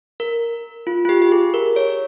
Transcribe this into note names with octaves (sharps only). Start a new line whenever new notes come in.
A#4
F4
F4
G4
G4
G#4
A#4
C#5